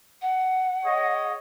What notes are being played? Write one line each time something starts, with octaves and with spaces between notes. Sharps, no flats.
F#5
G#4 C#5 D#5